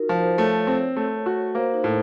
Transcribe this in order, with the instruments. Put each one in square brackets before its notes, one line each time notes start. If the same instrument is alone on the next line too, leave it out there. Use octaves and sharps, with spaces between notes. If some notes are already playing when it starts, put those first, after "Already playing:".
Already playing: [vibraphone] D#4 F4 F#4 A#4
[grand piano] F3 [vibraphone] C5
[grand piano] A3 [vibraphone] C#5
[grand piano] C4
A3
F#4
[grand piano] A#3 [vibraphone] C5
[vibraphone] D#4
[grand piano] A2